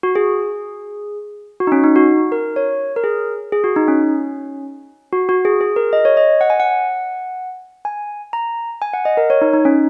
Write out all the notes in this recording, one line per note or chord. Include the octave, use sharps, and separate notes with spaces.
F#4
G#4
F#4
D#4
C#4
D#4
F#4
A#4
C#5
A#4
G#4
G#4
F#4
D#4
C#4
F#4
F#4
G#4
G#4
A#4
D#5
C#5
D#5
F#5
G#5
F#5
G#5
A#5
G#5
F#5
D#5
A#4
C#5
D#4
D#4
C#4